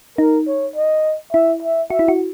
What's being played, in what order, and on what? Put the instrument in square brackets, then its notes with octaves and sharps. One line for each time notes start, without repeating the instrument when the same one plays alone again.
[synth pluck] D#4 [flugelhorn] A#4
[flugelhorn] C#5
D#5
[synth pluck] E4 [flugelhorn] E5
[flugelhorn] E5
[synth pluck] F#4 [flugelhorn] E5
[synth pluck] E4
F#4